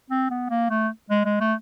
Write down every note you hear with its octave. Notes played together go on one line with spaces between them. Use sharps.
C4
B3
A#3
A3
G#3
G#3
A3